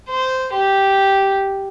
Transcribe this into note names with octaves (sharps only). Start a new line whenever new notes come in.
C5
G4